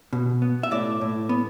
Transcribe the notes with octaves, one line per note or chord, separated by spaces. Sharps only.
B2
B3
E5
A2 D5
A2
B3